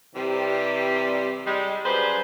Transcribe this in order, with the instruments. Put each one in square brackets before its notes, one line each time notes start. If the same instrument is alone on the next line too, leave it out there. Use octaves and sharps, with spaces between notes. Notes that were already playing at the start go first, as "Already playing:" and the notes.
[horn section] C3 E3 G3
G3 G#3
F#2 G3 G#4 B4 C5